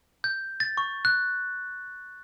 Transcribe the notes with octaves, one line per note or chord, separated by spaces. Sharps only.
G6
A6
C#6
F#6